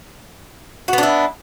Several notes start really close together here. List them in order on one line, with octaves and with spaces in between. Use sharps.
F#4 B3 D4 E4